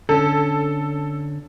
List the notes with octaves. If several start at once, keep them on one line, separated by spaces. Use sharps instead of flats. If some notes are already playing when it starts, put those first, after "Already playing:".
D3 C#4 A4